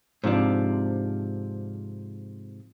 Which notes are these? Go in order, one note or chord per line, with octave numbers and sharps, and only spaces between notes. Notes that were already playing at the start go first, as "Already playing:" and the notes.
G#2 C3 F3 D4